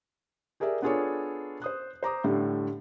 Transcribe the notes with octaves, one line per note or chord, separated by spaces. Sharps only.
G4 G#4 A#4 D5 E5
B3 D4 F4 G#4 A4 C#5
C5 D#6 F#6
C5 A#5 D6 D#6
A2 D3 G3 A3